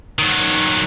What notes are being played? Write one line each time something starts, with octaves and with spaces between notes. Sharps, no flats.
D#3 F#3